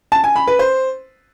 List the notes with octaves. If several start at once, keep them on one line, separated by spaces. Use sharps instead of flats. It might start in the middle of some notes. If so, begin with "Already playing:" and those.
A5
G#5
B5
B4
C5